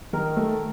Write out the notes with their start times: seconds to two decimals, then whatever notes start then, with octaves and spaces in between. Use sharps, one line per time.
0.13 D#3 A#4
0.36 A3